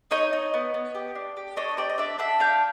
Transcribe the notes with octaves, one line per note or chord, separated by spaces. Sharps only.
D#4 C#5 D#5
D#4
B3
B3
G4
D4
G4
D4 C#5 D#5
G4 C5 D5
D#5
D4 D5 E5
D4 E5 F#5
D4 F5 G5